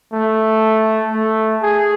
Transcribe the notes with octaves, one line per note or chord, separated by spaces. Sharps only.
A3
A3
G#4